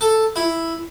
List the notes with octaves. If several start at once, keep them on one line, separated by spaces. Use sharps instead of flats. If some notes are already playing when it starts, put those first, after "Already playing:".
A4
E4